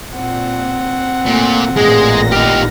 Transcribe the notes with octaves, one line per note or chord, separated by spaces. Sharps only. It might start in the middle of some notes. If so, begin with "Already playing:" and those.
A#2 C4 F#5
A#2 A3
A1 A#2 G#3 G#4 A#6
D#4 G4 F6